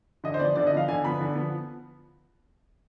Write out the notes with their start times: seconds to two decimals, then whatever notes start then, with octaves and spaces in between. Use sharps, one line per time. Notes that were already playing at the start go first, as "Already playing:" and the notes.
0.24 D3 D#5
0.34 C5
0.40 F3 B3 D5
0.55 D3 D5
0.67 D#5
0.72 F3 B3 F5
0.88 D3 G#5
1.04 F3 B3 B5
1.21 D3
1.36 F3 B3